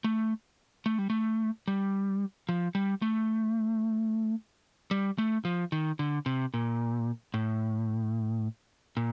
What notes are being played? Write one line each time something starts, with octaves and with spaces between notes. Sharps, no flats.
A3
A3
G3
A3
G3
F3
G3
A3
G3
A3
F3
D#3
D3
C3
A#2
A2
A#2